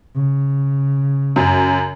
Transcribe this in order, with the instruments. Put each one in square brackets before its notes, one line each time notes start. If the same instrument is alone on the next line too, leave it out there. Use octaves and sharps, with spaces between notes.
[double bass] C#3
[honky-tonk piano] F#2